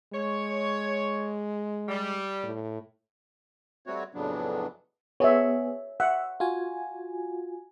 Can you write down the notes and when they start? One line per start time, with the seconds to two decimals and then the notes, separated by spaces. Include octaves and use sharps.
0.13 G#3 C#5
1.88 G3
2.43 A2
3.86 G3 A3 C4 F#4 C#5
4.15 F2 A2 C#3 F#3 B3 D4
5.20 B3 G#4 C#5 E5
6.00 E5 F#5
6.40 F4 F#4 G#5